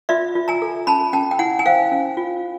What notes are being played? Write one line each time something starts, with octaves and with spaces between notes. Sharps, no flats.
F4 D5 E5
F4
G#5 A#5
A4
C#4 A5 B5
C#4 G5 A5
G5
E4 F#5 G#5
G#5
C5 F5 G5
C#4
F4